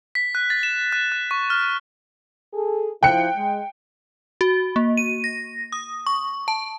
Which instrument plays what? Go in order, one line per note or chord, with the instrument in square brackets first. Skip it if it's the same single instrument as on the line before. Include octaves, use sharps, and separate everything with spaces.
[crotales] B6
F#6
A6
E7
F#6
F#6
C#6
F6
[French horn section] G#4 A4
[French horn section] F3 E4 [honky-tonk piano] G5 F#6 C#7
[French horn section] G#3
[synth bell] F#4
A#3
D#7
A#6
D#6
C#6
A5